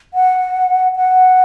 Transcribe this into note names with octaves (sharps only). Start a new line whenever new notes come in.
F#5
F#5